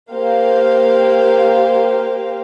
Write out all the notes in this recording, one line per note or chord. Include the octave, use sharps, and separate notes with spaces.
A#3 G4 C5 F5